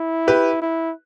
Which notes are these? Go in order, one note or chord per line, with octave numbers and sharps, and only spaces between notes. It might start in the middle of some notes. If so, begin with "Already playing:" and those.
Already playing: E4
G4 B4
E4